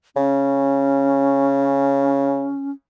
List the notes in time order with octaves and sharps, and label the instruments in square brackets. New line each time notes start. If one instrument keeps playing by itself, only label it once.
[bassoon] C#3 [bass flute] C#4